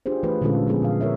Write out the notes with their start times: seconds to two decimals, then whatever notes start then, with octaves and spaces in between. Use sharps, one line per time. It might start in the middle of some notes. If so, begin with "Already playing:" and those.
0.06 D4 F4 G4 G#4 C5
0.23 E3 A3 F4 B4
0.41 A#2 D3 G#3 C#4 F4 A4
0.67 F3 A#3 B3 G#4 A4
0.82 A#2 F5
1.01 A#4 C#5 E5